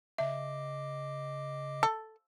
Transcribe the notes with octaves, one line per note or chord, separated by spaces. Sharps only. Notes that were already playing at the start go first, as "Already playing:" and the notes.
C#3 D#5 E5 D6
A4